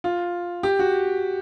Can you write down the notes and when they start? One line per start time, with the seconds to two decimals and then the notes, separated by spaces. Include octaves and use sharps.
0.04 F4
0.63 G4
0.79 F#4